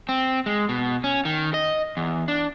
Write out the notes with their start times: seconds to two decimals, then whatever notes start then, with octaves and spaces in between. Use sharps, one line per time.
0.09 C4
0.46 G#3
0.69 B2
1.04 C#4
1.25 D#3
1.54 D#5
1.97 E2
2.28 D4